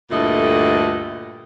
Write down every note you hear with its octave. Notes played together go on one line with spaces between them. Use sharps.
D2 G2 A#2 E4 A4 D#5